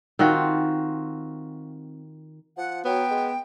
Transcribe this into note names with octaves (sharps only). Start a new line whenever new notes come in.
D#3 C4 F4 F#4
F3 F#5
F#3 B3 G5
G#3